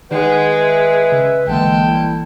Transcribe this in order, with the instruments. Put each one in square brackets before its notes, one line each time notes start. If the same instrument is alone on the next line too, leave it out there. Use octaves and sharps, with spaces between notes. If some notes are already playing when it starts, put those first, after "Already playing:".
[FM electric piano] D#3 C7 [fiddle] G#3 [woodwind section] B4 [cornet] F#5
[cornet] E5
[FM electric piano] C#3
[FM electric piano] A#1 E3 A#3 [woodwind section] D3 G#3 [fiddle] A4 [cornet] G5
[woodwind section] G3 E4